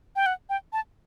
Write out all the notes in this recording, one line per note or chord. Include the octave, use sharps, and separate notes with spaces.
G5
F#5
G5
A5